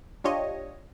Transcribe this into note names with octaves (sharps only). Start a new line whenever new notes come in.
D4 F4 G4 C#5 D#5